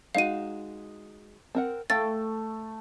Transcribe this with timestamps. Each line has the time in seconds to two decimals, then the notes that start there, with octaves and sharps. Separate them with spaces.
0.15 G#3 D#4 F#4 F5 D#7
1.55 C4 A#4 F#5
1.90 A3 A4 F5 G5 A6